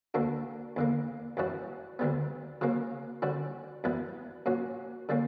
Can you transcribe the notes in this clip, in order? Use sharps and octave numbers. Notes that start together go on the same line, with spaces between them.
D2 D3 A#3 D4 F#4
E2 D3 A#3
F#2 E3 G3 C#4 F#4
D2 D3 G3 B3
C#3 F#3 A#3 C#4
D3 G3 C#4 F#4
F#2 E3 G3 B3
A#2 F#3 C#4 F#4
D3 G3 A#3 C#4